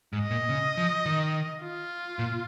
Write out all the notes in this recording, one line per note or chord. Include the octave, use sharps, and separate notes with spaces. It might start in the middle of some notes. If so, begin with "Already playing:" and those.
G#2
D#5
A#2
C#3
F3
D#3
F4
A#2